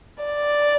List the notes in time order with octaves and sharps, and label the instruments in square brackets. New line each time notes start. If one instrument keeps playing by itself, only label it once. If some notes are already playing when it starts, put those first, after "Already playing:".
[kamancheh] D5